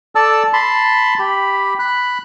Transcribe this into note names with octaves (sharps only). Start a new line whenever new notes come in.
A4 D5 A5 E6
A5 B5 C6
G4 B5
B5 F#6